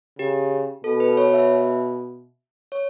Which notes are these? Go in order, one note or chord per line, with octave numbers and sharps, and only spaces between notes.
C#3 G4
B2 A4
B4
C#5
E5
C#5